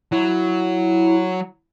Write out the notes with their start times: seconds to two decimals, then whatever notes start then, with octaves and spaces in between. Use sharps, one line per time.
0.12 F#3 E4